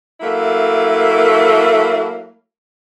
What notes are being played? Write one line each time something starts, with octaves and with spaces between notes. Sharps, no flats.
F#3 A3 A#3 E4